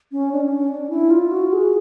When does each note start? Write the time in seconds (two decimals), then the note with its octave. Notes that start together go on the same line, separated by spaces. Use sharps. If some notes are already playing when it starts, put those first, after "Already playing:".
0.12 C#4
0.32 D4
0.41 C#4
0.68 D4
0.89 E4
1.10 F4
1.31 F#4
1.53 G#4